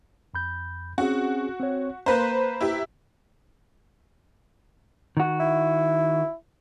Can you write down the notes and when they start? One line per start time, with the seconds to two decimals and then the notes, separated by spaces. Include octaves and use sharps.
0.34 F2 B5 G6
0.98 C4 C#4 F#4 G#4
1.60 C4 C#5
2.06 A#3 B4 C5 A#5 F#6 G6
2.61 E4 G4 E5
5.17 D#3 F#4
5.40 E4